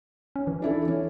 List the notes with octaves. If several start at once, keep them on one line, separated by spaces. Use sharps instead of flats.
C#4
E3
D4 E4 A4
C#4